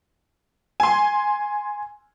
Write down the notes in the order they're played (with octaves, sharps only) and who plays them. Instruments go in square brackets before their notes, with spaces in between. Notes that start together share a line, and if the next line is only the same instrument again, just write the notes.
[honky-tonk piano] G#5 C6